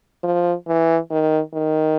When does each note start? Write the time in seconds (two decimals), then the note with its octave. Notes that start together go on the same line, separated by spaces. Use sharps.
0.24 F3
0.67 E3
1.10 D#3
1.54 D#3